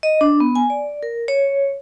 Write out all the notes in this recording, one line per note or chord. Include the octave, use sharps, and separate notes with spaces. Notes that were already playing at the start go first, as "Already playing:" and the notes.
D#5
D4
B3
G#5
D5
A#4
C#5